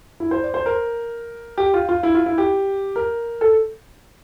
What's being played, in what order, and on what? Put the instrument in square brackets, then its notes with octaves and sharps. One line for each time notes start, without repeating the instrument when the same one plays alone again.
[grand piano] E4
C5
D5
C5
A#4
G4
F4
F4
E4
F4
E4
G4
A#4
A4